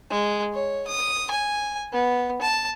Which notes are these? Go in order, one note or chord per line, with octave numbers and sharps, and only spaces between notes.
G#3
C#5
D#6
G#5
B3
A5